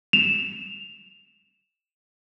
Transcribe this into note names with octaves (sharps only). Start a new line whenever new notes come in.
E7 F7